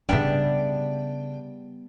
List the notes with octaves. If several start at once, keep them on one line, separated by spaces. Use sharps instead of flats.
C#3 G3 B3 C#4 D4 E5 G5